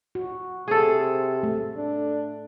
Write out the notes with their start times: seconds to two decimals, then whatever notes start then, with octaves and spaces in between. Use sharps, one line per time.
0.15 F#4
0.68 C3 G#4 A4
1.43 A3
1.77 D4